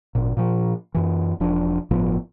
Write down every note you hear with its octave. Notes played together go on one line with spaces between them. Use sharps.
G#1 A#2
A#2 F3
F#2 E3
E1 F3 D4
G1 A2 F3 B3